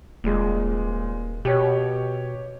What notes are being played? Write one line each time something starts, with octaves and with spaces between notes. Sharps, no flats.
D#1 A#2 G#3
B2 G4 C#5